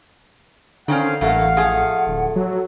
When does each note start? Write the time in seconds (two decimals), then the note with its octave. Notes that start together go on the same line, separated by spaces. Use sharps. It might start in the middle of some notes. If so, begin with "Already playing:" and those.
0.88 D3 D#3 C4 C#4 F5
1.21 A1 G2 A3 A#3 F#5
1.57 F3 A3 G#4
2.07 D1
2.36 F#3 A4